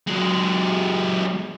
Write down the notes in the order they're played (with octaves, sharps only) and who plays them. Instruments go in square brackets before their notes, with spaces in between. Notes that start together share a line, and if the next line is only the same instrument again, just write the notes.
[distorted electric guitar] F#3 G#3